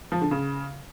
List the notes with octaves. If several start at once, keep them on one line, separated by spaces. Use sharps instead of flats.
F3
D3
C#3